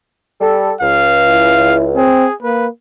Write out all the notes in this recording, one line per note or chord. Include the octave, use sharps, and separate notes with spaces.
G3 A4
C#2 F5
E4
C4 G#4
A#3 B4